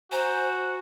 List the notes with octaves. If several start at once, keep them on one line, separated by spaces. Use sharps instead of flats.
F#4 C5 G#5 A#5 G6